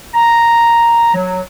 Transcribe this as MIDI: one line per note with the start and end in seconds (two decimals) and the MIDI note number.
0.14 1.11 82
1.14 1.40 54